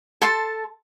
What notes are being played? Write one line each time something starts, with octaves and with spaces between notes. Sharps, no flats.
A4 A5 C6